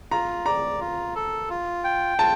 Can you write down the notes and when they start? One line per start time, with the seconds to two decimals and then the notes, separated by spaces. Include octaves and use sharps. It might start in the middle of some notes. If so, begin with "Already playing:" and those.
0.11 F4 A#5
0.46 D5 A#5
0.80 F4
1.16 A4
1.50 F4
1.84 G5
2.19 F4 A5